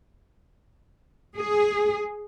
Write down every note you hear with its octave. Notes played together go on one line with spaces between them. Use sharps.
G#4